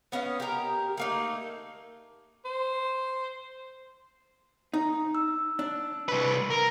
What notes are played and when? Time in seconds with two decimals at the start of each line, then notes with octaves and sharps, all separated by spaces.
0.12 B3 C#4 D#5 F5
0.40 G4 A#4
0.97 A3 A#3 D#4
2.45 C5
4.74 D#4
5.15 E6
5.59 D4
6.08 C2 B4
6.50 A#4